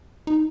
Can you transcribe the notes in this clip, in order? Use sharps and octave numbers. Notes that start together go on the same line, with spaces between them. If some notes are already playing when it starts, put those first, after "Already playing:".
D#4